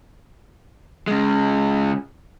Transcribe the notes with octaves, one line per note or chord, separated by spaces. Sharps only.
C#3 G#3